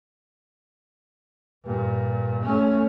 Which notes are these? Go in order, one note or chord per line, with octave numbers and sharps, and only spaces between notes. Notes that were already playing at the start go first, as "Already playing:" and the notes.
G2 A#2
A3 C#4